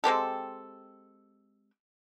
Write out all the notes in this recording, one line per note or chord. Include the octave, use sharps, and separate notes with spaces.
G#3 C4 G4 A4